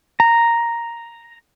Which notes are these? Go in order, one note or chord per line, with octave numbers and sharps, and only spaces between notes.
A#5